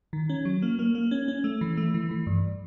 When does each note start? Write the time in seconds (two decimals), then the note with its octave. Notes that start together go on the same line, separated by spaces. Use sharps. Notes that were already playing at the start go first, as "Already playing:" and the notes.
0.13 D#3
0.29 C#4
0.45 F#3
0.62 A#3
0.79 A#3
0.95 A#3
1.11 C#4
1.28 C#4
1.44 A3
1.61 E3
1.77 A3
1.94 E3
2.11 E3
2.27 G2